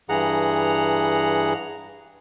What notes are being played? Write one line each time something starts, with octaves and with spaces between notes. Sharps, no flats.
G2 E3 G#4 F#5 A#5